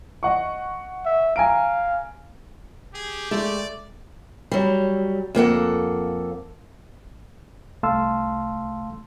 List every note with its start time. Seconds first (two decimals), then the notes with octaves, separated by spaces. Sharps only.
0.23 D#5 F#5 C#6
1.05 E5
1.36 F5 G#5 A#5 D7
2.94 G4 G#4
3.31 G#3 A3 D5
4.52 F#3 G3
5.35 F2 A#3 A4 F#5
7.83 C2 A3 F5 A5 C6 E6